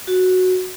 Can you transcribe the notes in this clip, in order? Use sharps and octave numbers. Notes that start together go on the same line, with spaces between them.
F#4